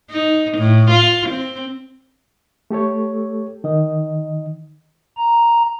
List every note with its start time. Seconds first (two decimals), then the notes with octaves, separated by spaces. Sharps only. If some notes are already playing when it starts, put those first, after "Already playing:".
0.11 D#4
0.58 A2
0.90 F4
1.29 C4
2.71 A3 G4 A4 C#5
3.64 D#3 D#5
5.17 A#5